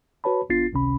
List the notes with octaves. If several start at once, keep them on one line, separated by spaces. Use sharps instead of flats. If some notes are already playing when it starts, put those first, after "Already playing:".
F#4 B4 C#5 A5 B5
G#1 B3 D4 F4 A6 C7
G#1 C#2 C3 C#4 B5